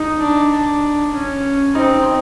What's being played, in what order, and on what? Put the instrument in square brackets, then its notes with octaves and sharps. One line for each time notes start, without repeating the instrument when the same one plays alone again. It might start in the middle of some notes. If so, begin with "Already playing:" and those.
Already playing: [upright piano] D#4
[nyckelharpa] D4
D4
C#4
[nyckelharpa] C4 [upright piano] D#4